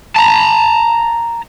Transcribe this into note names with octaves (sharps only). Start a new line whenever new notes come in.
A5 A#5